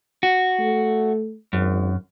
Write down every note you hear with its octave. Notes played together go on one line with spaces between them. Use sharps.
F#4
A3
G#1 F#2